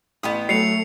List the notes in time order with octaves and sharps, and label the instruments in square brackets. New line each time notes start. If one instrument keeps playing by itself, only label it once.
[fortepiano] A1 [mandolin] B3 G5 D#6
[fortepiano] F#3 [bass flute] A3 [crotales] C7 C#7 F7